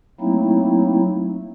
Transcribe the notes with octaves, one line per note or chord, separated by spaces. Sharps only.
F#3 A3 A#3 C4 D#4 E4